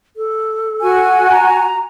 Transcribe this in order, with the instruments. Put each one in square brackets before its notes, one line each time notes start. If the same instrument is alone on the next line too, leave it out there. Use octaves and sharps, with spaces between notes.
[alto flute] A4
[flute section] F#4 G#5
[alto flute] A#5